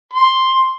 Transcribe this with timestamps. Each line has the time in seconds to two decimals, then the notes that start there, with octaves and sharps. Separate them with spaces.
0.13 C6